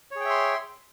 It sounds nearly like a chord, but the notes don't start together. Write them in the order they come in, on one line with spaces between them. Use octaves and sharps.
C#5 G#4 G5 E5 C6